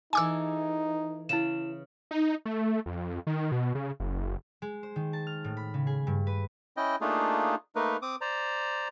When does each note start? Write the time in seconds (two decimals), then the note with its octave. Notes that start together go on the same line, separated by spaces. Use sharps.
0.13 E3 D#4 G#4 A4 G#5 D6 E6
1.29 C#3 E4 E7
2.11 D#4
2.45 A3
2.86 F2
3.27 D#3
3.52 B2
3.75 C#3
4.00 F#1
4.62 G#3
4.83 C5
4.96 D#3
5.13 A5
5.27 F6
5.44 A2
5.57 B5
5.74 C#3
5.87 G#4
6.07 G2
6.27 B4
6.77 C#4 E4 D#5 G5
7.01 A3 A#3 D4 D#4 F4 G#4
7.75 A3 A#3 D#4 A#4 B4
8.02 C4 D6 D#6
8.21 C5 D5 A#5